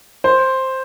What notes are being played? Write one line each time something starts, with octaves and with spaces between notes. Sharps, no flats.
C5